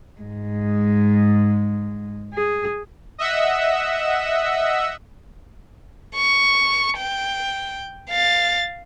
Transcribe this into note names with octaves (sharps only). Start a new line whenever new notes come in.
G#2 G#3
G#4
D#5 E5 F#5 E6
C#6
G5
F5 A6